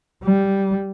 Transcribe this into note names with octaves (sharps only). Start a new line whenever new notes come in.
G3